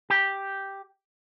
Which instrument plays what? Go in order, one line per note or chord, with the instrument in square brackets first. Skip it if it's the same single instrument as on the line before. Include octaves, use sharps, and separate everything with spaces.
[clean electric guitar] G4